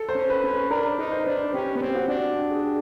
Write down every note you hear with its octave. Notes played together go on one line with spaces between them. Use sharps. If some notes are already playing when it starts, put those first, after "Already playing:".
Already playing: A4
C5
C#4
B4
C#4
B4
D4 A#4
D#4
C5
D4 B4
C5
C#4 G4
B3
C4
G4
F#4
D4
G4
G#4
G4